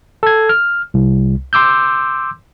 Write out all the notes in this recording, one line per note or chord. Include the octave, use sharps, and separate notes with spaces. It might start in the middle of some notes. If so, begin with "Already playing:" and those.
A4 G#6
F6
C2
C6 D6 E6 G6